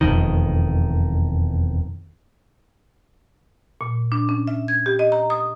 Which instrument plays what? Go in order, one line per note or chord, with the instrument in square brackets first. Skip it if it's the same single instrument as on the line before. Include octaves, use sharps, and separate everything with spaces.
[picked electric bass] E1 F2 D#3
[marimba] A#2
D4
C#4
E5
G#6
G4
D#5
A#5
D#6